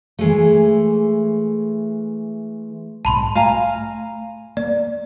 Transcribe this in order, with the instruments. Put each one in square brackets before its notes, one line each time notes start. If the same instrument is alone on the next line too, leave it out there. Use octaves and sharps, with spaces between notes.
[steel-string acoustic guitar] E3 G#3 A3
[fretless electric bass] B1 G#2 G#3 [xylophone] A5 B5 C6
[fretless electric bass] A3 [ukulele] F5 G#5 A#5
[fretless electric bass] A#3 [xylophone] D5